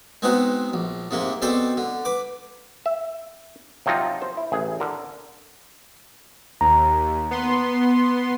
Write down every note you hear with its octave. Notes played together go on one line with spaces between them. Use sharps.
G#3 B3 C4 D#4 F#4
A#1
G#2 C3 A#3
B2 C4 A4 C5 D5 G5
D3
B4 D6
E5
C3 F3 F#3 C4 D#4 F4
C5
E4
A1 G#4
D3 A#4
D#2 A#5
B3 C6